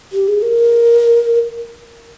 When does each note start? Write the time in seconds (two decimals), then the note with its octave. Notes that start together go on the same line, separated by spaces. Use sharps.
0.13 G4
0.28 G#4
0.42 A#4